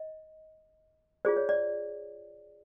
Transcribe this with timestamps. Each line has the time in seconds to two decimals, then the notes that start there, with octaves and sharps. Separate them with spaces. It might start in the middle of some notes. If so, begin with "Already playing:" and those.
Already playing: D#5
1.25 F4 G#4 C5 D5
1.37 C#5
1.49 D5